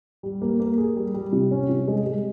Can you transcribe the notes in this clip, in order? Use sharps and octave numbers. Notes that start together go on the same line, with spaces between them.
G3
A#3
A#3
G#4
G3
G3
C3
C#4
C3
G#3
G#3